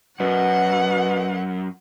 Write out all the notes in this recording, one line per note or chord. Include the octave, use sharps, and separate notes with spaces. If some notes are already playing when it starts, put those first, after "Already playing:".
F#2 B2 F#5